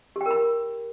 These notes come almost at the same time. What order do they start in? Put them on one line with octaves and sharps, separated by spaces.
G4 G5 A#4 B5